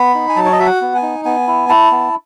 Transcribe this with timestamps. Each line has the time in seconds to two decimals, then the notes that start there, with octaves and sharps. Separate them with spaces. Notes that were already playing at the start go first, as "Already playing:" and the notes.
Already playing: B3 B5
0.14 D#4
0.29 G#5
0.36 F#3 A5
0.45 C#5
0.52 D#5
0.59 F#4 E5
0.66 F#5
0.81 B3
0.95 G#5
1.02 D#4
1.25 B3 G#5
1.47 E4
1.69 E4 A5
1.91 B3